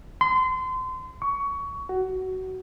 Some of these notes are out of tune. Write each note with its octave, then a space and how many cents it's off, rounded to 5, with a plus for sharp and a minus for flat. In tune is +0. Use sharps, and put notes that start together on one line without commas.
C6 -30
C#6 +20
F#4 +20